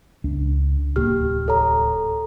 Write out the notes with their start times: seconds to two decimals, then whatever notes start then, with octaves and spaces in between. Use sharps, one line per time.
0.24 C#2 D4
0.96 D1 C2 A#3 G4 F6
1.48 A4 C#5 A#5